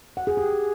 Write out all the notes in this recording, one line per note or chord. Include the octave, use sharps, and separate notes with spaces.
F#5
G#4
G4